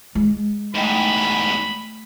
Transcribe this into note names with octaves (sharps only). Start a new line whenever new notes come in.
G#3
E2 G#2 A3 D#5 G5 B5